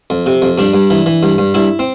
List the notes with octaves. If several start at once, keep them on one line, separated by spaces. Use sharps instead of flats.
F2
C3
F2
G2 D4
G2
E3
E3
G2
G2
G2 E4
C4